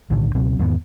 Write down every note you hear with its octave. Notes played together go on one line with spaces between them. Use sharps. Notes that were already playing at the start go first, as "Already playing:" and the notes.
B1 A2 D3 D#3
C#2 B2 F#3 C4
E2 G#2 D#3 B3